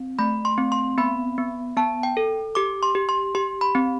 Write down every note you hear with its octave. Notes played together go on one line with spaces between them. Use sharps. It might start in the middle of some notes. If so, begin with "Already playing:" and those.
Already playing: C4
A3 B5
C6
C4
C6
B3 B5
B3
B3 A5
G5
A4
G4 D6
C6
G4
C6
G4 C6
B5
C4